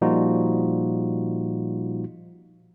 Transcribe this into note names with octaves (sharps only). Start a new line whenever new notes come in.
A#2 F3 G3 D#4 F4 F#4